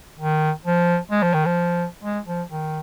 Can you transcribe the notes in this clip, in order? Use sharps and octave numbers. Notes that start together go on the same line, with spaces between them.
D#3
F3
G#3
F3
D#3
F3
G#3
F3
D#3